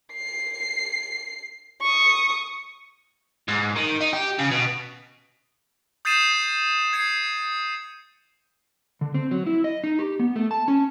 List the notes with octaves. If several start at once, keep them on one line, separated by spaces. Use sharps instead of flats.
C7
C#6 D#6
G#2
D#3
D#4
G4
C#3
B2
D#6 G6 A6 C7 D#7 E7
G#6 C7 C#7 E7
D3
C4
F#3
E4
D#5
D#4
G4
B3
A3
A5
C#4